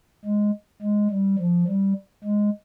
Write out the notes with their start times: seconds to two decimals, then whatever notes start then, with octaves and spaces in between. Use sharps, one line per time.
0.25 G#3
0.82 G#3
1.10 G3
1.39 F3
1.68 G3
2.24 G#3